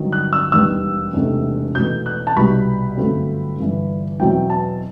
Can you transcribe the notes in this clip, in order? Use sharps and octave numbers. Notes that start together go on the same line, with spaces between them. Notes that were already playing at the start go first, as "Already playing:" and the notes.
Already playing: G1 G2 D#3 F#3
F#6
E6
E1 D#2 D#3 G3 B3 E6
E1 E2 C3 D#3 A3
E2 B2 A3 D#4 G6
F#6
A5
C2 B2 G3 B3 D#4 B5
G1 F#2 F#3 A3 C4
G1 G2 E3
E2 B2 F#3 C4 E4 G5
A5